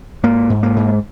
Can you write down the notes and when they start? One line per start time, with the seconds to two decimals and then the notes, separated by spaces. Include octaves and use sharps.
0.23 G#2 A#3
0.50 G#2
0.63 A#3
0.76 G#2